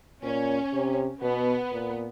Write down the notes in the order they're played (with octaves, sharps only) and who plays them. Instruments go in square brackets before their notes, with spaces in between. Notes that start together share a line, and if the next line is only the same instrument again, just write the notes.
[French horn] A#2 [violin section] C#4
[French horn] C3
[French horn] B2 [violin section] B3
[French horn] A#2